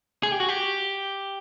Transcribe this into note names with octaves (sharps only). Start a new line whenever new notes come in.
G#4
G4
F#4
G4